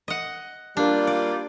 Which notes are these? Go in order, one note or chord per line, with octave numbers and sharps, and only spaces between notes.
D#5 F#5
G3 A#3 D4 F4
D5